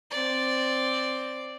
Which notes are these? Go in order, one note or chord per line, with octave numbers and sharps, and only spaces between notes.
C4 D5